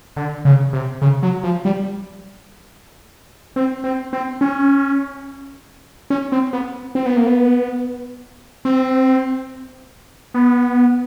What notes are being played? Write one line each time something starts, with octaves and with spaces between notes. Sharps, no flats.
D3
C#3
C3
C#3
F#3
F3
G3
C4
C4
C4
C#4
C#4
C4
B3
C4
B3
A#3
B3
C4
B3